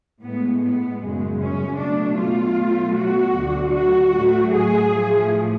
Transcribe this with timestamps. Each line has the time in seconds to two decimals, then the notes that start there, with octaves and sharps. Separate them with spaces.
0.22 A2 G#3 B3
0.62 B3
1.00 F#2 C#3 G#3
1.40 C#4
1.78 B2 F#3 A3 D4
2.18 F4
2.57 B2 F#3 A3
2.95 F#4
3.34 D2 D3 F#3
3.73 F#4
4.12 A2 F#3 A3
4.52 G#4
4.90 A2 F3 A3